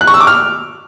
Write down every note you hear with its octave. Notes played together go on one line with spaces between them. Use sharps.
F#6
C#6
E6
D6
F6